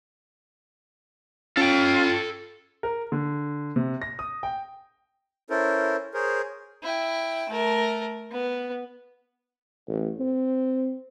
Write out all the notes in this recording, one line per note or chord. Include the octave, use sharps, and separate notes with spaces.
C#4 F4 A4 G5
A#4
D3
C3
A#6
D#6
G5
C#4 E4 A4 A#4 C5
G#4 A#4 C5 C#5
E4 G5
A3 A#4
B3
A1
C4